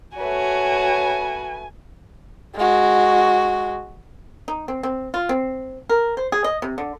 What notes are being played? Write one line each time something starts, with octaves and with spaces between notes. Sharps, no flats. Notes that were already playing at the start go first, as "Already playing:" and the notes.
A3 F#4 B4 C#5 G#5
G#3 F#4
D#4
C4
C4
F4
C4
A#4
C5
G#4
D#5
C3
D3